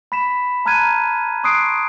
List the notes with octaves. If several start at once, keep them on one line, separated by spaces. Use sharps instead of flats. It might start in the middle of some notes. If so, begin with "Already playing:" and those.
B5 B6 E7
A5 A#5 F6 F#6 G#6 D#7
C6 C#6 D#6 F#6 C7 D7